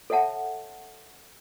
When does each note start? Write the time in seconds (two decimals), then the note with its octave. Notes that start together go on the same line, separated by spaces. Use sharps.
0.10 A4 C#5 E5 F#5 A5